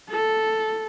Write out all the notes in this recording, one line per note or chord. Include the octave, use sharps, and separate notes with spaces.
A4